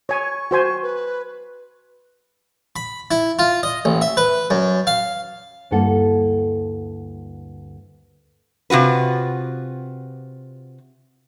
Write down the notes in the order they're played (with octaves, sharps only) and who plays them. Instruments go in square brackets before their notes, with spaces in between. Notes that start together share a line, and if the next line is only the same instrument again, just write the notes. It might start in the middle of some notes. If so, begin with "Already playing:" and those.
[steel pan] C#5 G#5 [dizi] C#6
[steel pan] F#4 C5 G#5
[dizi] B4
[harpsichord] B5
E4
F4
D#5
A1
E5
B4
F#2
F5
[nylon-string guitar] D2 G2 A#3 E4 A4 F#5
[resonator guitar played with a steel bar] C3 F4 F#4 B4